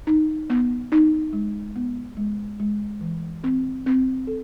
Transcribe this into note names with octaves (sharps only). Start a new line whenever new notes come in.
D#4
B3
D#4
G#3
B3
G#3
G#3
E3
C4
C4
A4